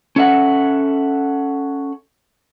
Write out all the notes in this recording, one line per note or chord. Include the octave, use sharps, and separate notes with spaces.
C#4 A4 E5 F#5